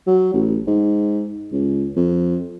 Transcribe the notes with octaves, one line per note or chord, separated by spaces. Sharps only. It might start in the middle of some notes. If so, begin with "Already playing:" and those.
F#3
A1
G#2
C#2
F2